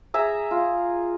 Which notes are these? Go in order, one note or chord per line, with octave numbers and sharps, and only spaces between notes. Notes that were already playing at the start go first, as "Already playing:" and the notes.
G#4 E5 A#5
F4